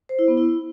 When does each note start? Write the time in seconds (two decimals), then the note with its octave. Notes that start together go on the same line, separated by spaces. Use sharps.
0.09 C5
0.19 E4
0.28 B3
0.37 E4